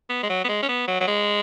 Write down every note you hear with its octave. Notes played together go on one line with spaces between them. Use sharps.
B3
G#3
F#3
B3
G#3
C#4
B3
F#3
F#3
G#3